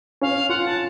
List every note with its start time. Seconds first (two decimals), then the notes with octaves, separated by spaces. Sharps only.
0.21 C#4 F5
0.49 F4 F#5
0.66 A5